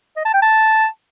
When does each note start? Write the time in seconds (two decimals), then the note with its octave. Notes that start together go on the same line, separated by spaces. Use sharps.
0.17 D#5
0.25 A5
0.34 G5
0.42 A5